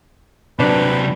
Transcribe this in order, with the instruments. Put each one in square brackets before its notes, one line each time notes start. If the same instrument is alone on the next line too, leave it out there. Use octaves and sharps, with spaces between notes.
[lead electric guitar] C3 F#3 [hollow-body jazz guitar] D4 D5 A5 [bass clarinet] B4